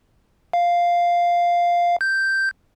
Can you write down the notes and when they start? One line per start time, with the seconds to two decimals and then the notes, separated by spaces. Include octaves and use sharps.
0.53 F5
2.01 G6